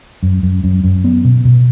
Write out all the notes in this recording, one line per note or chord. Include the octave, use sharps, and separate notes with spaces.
F#2
F#2
F#2
F#2
B3
B2
B2